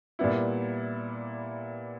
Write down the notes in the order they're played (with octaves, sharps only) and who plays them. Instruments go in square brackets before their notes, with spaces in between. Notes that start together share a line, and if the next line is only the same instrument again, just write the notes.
[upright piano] A#2 G3 B3 E4